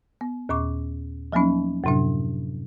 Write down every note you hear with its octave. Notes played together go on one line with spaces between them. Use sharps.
B3
D#2 A#2 C#6 D6
F3 F#3 A#3 B3 C#4 D#4
F#2 A2 C3 F#3 D4